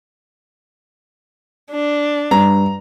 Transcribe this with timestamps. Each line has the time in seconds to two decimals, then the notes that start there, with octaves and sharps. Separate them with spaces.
1.72 D4
2.31 G2 A#5